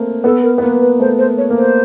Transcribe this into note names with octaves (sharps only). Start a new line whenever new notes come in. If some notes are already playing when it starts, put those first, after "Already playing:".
Already playing: A3 A#3 C4
B3 A4
A#4
B3
A#3 B4
B4
A3 C5
C5
C#5
A#3
C5